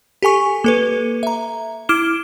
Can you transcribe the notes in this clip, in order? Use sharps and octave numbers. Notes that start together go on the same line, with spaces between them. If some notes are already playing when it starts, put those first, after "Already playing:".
G4 A4 G#5 C#6
A#3 A4 B4
E5 A#5
E4 D6 F6 D7 E7 G7